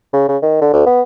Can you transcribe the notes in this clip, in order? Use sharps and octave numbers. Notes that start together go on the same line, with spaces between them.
C#3
C#3
D#3
D3
D2
B3